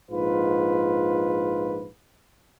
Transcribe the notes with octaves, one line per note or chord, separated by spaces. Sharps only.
A#1 G#2 F4 B4